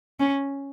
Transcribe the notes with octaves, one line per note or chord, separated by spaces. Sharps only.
C#4